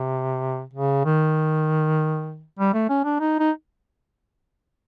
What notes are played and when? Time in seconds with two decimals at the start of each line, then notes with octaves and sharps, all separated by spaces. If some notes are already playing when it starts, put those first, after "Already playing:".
Already playing: C3
0.73 C#3
1.05 D#3
2.59 G3
2.73 A3
2.89 C#4
3.04 D4
3.20 D#4
3.40 D#4